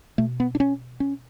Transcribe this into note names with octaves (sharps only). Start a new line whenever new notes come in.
B2 A3
B3
D4
C#4
C#4